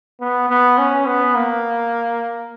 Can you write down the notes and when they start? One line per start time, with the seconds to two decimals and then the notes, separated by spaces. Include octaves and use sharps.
0.20 B3
0.49 B3
0.78 C#4
1.06 B3
1.35 A#3